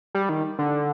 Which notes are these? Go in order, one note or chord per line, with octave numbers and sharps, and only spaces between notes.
G3
D#3
D3